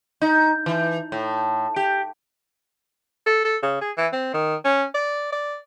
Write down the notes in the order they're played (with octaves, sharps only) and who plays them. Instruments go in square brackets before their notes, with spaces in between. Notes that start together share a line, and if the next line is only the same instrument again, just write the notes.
[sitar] D#4
E3
A2
G4
[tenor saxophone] A4
A4
C#3
G#4
E3
C4
D#3
C#4
D5
D5